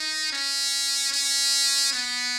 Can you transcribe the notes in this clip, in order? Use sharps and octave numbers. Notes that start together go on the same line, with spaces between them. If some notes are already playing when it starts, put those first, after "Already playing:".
Already playing: D#4
C#4
C#4
B3